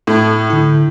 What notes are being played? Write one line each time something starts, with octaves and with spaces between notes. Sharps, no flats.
A2
D3 E4